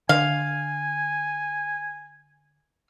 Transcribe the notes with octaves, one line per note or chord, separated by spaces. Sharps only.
D3 F5 G#5